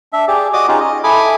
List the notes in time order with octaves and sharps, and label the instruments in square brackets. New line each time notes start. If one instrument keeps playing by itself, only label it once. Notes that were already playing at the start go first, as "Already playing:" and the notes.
[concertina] D4 E5
G4 G#4 D5
F#4 D5 D#5 D6 D#6
C#4 D#4 F4 G4 G#4
D#5
E4 A4 G#5 B5 D6 D#6